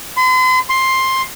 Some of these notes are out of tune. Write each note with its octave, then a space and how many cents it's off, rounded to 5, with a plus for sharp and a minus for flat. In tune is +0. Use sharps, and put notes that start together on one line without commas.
C6 -45
C6 +10